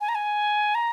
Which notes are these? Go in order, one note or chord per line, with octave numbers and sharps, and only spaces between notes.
G#5
A#5
G#5
A#5